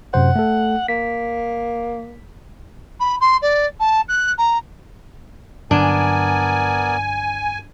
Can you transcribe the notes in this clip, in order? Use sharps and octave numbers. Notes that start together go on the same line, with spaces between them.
F#2 C3 C5 F#5
A3 A4
A#3 B6
B5
C6
D5
A5
F#6
A#5
G2 D3 F#3 B3 D4 A#4 D5 G#5